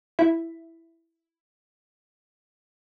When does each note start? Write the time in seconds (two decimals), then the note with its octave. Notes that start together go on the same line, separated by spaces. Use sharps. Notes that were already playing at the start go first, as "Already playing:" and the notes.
0.19 E4 E5